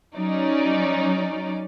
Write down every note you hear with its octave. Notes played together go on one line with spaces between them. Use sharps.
F#3 C#4 D#4 D5